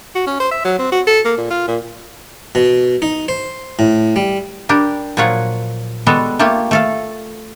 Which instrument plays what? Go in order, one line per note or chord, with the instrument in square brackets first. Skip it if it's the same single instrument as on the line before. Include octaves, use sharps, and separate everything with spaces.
[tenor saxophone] F#4
C#4
C5
E5
F#3
C4
F#4
A4
A#3
A#2
F4
A#2
[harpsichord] B2
D#4
C5
A2
G3
[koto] G3 D4 G4 A#4
A#2 F3 F#3 F4 C#5 F#5
G3 G#3 B3 F#4 A4
A3 A#3 F4 G4
A3 A4 F5